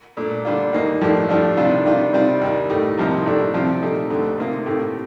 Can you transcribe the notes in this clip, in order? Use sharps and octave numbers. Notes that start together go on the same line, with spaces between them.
A#2 A3 D4
D3 G3 D4 F4
D#2 D#3 A#3 D#4
A2 F3 A3 D4 G4
A2 F3 A3 D4 F4
C3 D#3 G3 D4 F4
C3 D#3 G3 D4 F4
C3 G3 C4 F4
D#2 D#3 G3
A2 A3 D#4 G4
C2 C3 F3 A#3 D#4
A2 A3 D4 G4
C3 F3 C4 F4
A#2 A3 D#4 G4
D2 D3 A3
C3 D#3 A#3 F4
A2 A3 C4 G4